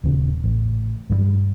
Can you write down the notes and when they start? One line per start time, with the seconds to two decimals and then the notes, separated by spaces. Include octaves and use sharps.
0.04 D#1 E2 C#3
0.44 A1
1.10 G2 F3 G3